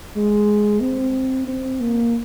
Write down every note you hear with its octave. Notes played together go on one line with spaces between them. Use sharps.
G#3
C4
C4
A#3